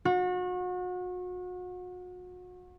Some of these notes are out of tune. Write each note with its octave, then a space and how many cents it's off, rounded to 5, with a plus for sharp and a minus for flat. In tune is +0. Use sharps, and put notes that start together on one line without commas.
F#4 -35